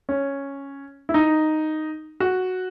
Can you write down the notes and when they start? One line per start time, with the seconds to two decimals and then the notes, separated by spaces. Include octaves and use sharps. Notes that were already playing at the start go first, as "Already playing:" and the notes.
0.09 C#4
1.09 E4
1.14 D#4
2.20 F#4